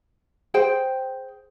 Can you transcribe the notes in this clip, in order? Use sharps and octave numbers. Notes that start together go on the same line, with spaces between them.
G#4 C5 G5